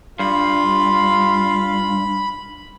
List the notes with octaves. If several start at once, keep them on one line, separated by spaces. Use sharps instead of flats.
G2 F4 B5